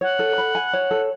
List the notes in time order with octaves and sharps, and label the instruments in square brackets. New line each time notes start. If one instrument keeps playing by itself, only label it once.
[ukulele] C#5 [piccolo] F#5
[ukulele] A4
B5
G#5
C#5
A4